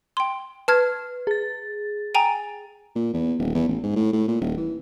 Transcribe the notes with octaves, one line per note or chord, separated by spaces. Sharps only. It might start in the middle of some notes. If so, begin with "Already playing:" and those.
G5 C6
B4 A5 F6 G#6
G#4 A6
G5 G#5 A#5
A#2
E2
D#1
E2
A1
G#2
A2
A2
A#2
D#1
E3